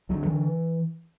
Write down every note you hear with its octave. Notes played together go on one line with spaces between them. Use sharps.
D2 F#3
D3 E3